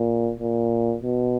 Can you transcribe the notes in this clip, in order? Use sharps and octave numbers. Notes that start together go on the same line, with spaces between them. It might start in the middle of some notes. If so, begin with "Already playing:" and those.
Already playing: A#2
A#2
B2